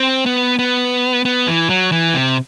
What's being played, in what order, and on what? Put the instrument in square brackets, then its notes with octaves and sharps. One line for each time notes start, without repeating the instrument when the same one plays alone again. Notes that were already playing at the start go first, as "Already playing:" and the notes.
Already playing: [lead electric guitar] C4
B3
B3
B3
E3
F#3
E3
C3